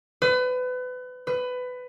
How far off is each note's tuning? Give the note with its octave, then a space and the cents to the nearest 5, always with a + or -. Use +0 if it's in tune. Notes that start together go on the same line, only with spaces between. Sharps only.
B4 +30
B4 +20